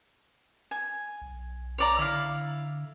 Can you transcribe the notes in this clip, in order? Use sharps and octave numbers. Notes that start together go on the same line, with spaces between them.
G#5
B1
C#5 D5 A#5
D3 E4 F5